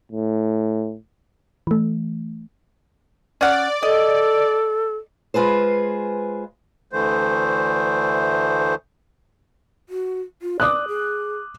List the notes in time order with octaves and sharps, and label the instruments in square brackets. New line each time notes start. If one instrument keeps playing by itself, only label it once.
[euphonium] A2
[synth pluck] E3 A3
[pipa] C#4 F#5 [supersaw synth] D5
[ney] A4 [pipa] D#5
[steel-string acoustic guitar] G#3 F4 G#4 B4 C5
[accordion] D2 D3 E3 A3 C5
[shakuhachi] F#4
F4
[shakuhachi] D5 [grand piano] D6 D#6 F#6
[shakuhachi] G#4